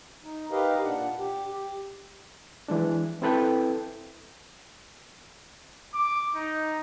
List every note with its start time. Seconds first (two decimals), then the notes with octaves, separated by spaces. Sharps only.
0.24 D#4
0.51 D#4 G4 A#4 B4 D#5 F5
0.84 A#2 D4 F#5
1.18 G4
1.50 G4
2.68 E3 G#3 D4
3.22 C4 E4 A4 B4 G5
5.94 D6
6.35 D#4